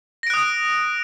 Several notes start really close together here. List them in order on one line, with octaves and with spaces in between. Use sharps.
A#6 D7 F#6 D#6